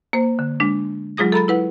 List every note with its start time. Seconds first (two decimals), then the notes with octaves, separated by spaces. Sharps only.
0.13 A#3 C5
0.39 D3
0.60 G#3 D4
1.17 F#3 G#3 F4 G#4 D#6 A#6
1.32 A4 A#5 B5 A6
1.48 E4 B4 F#5